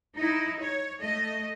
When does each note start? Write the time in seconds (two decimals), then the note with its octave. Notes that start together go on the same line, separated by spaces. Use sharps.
0.18 D#4 E4
0.60 C#5
1.00 A3 D#5